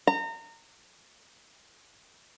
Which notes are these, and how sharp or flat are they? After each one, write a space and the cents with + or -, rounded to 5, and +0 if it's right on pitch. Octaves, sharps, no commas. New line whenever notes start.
A#5 -30